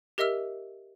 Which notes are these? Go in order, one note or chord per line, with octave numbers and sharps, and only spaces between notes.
G4 A#4 D#5 E5 E6 F6